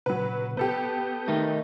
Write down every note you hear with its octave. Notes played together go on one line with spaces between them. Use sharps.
A#2 C#3 F#3 B4
B3 G4 A4 B4 D#6 G6
D#3 A3 D#4